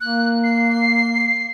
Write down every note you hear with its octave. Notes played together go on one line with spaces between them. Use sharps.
A#3 F#6
C7